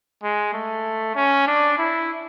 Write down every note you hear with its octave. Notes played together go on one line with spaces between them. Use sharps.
G#3
A3
C#4
D4
E4